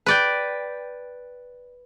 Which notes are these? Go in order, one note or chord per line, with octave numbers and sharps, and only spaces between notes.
B4 D5 G5